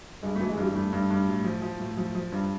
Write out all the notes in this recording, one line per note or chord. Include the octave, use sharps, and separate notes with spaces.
G2 G#3
A3
E3
G#3
G2 G3
G2 A3
G2
G2
A2
F3
F3
A2
F3
F3
G2